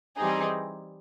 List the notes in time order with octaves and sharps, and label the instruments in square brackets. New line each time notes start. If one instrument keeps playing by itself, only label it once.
[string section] E3 G3 C4 D#4 G#4